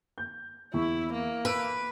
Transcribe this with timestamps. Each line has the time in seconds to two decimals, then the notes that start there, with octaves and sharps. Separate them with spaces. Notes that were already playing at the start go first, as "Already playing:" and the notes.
0.18 G6
0.74 E2 E4 C#6
1.13 A#3
1.45 B4 E6 D7